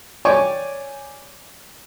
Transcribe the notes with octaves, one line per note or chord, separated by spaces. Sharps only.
C#5 D5 G5 G#5 C#6 D6